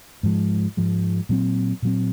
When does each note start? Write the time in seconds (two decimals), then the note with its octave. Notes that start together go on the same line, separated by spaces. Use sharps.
0.23 G#2 F3 G#3
0.77 G#2 F3 G#3
1.29 A#2 F#3 C4
1.82 A#2 F#3 C4